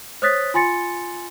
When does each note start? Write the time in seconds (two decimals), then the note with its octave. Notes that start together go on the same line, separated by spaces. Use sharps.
0.22 C5 C#5 D#6 F#6 A6 B6
0.54 F4 G#5 C6 A6 C#7